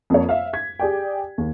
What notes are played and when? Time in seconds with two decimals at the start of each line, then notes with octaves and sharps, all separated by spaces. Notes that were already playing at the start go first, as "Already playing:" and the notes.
0.10 F2 A#3 C#5
0.29 E5 F5
0.53 G#6 B6
0.80 G4 G#4 D5 G5
1.38 D#2